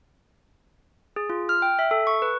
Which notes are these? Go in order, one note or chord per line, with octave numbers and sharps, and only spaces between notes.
G#4
F4
F6
G5
E5
A4
C#6
B4